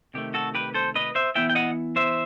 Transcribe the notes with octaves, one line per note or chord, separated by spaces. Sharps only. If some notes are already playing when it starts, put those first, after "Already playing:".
C3 D#3 A3 G4
F#4 A4
G4 B4
A4 C5
B4 D#5
C5 E5
E3 B3 E4 E5 G5
G5
D#5 F#5
C5 E5